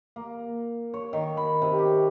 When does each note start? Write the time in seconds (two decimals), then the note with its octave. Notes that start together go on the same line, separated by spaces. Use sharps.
0.16 A#3
0.94 C#5
1.13 D#3
1.37 B5
1.62 C3
1.78 G4